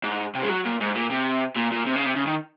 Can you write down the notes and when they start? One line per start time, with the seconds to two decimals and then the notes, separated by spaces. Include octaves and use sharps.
0.04 G#2
0.35 C3
0.43 G#3
0.49 F#3
0.65 A#2
0.81 G#2
0.95 A#2
1.11 C3
1.56 A#2
1.71 A#2
1.86 C3
1.96 C#3
2.05 C3
2.16 C#3
2.27 D#3